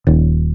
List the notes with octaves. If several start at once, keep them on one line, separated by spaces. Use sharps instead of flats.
D#1